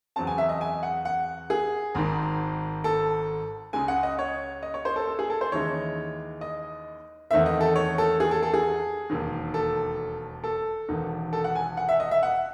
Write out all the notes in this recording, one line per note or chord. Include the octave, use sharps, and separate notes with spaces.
E2 C#3 F#3 C4 A5
G#5
E5
D#5
G#5
F#5
F#5
G#4
G#1 G#2 D#3
A4
C#2 C#3 G#3 G#5
F#5
D#5
C#5
D#5
C#5
C5
A4
A4
G#4
A4
C5
D#2 C#3 E3 G#3 D#4 C#5
D#5
E2 D#3 A3 C4 E5
D#5
A4
C#5
A4
G#4
A4
A4
G#4
E1 D#2 D#3
A4
A4
E1 E2 D#3
A4
F#5
G#5
F#5
E5
D#5
E5
F#5